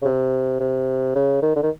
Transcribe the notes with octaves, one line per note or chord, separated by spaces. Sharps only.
C#3
C3
C3
C#3
D#3
D3
D#3